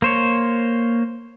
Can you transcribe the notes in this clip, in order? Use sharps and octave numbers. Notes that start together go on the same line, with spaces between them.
A#3 C5 C#5